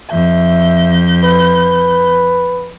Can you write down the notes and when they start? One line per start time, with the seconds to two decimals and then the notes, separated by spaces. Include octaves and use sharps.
0.11 F2 E5 G6
1.24 B4